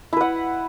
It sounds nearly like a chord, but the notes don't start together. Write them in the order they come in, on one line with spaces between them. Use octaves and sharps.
E4 B4 F#5